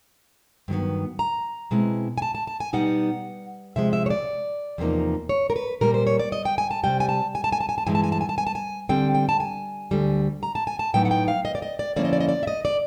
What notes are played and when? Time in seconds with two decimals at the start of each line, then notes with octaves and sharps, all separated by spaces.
0.68 G2 D#3 F#3 B3
1.19 A#5
1.71 B2 G#3 C4 E4
2.18 G#5
2.22 A5
2.35 A5
2.47 A5
2.60 G#5
2.73 B2 G3 B3 D#4 F#5
3.76 C3 F3 G#3 E5
3.93 E5
4.06 C#5
4.10 D5
4.78 E2 C3 F3 A#3 D#4
5.29 C#5
5.50 A#4
5.56 B4
5.81 A#2 G3 A#3 A#4
5.94 C5
6.07 C#5
6.19 D5
6.32 D#5
6.45 G5
6.58 G#5
6.71 A5
6.84 C3 D#3 G3 G5
7.00 G#5
7.09 A5
7.35 G#5
7.44 A5
7.52 G#5
7.61 A5
7.69 G#5
7.78 A5
7.86 G2 E3 G#3 B3 E4 G#5
7.95 A5
8.04 G#5
8.12 A5
8.21 G#5
8.29 A5
8.38 G#5
8.47 A5
8.55 G#5
8.89 D3 G3 C4 G5
9.14 G5
9.29 A5
9.40 G#5
9.91 D2 D3 G3
10.43 A#5
10.55 A5
10.67 G#5
10.79 A5
10.94 A2 F#3 B3 D#4 G5
11.05 F#5
11.11 G5
11.28 F5
11.45 D#5
11.55 D5
11.62 D#5
11.79 D5
11.96 D3 F3 A#3 C#4 E4 D5
12.05 D#5
12.13 D5
12.20 D#5
12.29 D5
12.43 E5
12.47 D#5
12.65 D5